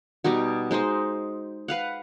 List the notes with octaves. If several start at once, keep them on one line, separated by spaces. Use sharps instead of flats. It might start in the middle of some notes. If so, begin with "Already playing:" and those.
B2 G3 D#4 F#4
G#3 D#4 C5 D#5
B4 F5 F#5